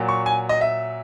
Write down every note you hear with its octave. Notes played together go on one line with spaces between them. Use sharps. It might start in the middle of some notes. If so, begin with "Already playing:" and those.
Already playing: A#2 F#3
C#6
G#5
D#5
E5